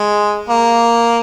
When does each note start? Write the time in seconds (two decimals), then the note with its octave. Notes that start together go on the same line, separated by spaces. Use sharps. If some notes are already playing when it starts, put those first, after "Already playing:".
Already playing: G#3
0.49 A#3